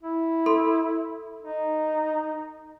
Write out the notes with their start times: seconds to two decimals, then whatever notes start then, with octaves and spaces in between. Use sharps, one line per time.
0.03 E4
0.46 A4 C6
1.42 D#4